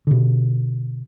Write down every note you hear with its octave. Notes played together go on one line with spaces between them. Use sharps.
B2 D3